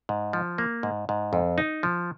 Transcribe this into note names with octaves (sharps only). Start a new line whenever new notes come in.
G#2
F3
A#3
G#2
G#2
F2
D#4
F3